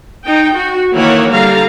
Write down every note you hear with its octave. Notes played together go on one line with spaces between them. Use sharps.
D#4 G5
F#4
D#3 E3 A#3 E4 C#5 F#5
D3 G3 F5 A#5